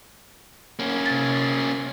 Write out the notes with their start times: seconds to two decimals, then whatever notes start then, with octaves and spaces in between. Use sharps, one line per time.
0.79 A#3 C#4
1.06 C3 A6